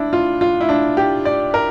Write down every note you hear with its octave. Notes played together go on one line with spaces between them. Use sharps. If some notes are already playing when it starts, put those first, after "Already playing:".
Already playing: D4 E4
F4
F4
E4
D4
G4
D5
A#4